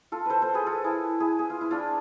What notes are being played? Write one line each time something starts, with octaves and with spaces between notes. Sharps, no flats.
F4 A4
A4 B4 C5
A4 C5
G#4 B4
F4 A4
E4 G#4
E4 G#4
G#4
F4
E4
D4 F4